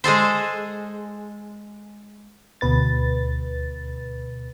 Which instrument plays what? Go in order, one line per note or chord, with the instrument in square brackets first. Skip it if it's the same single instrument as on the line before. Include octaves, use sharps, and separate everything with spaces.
[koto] G#3 G#4 A4 C5
[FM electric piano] D2 B2 B4 A6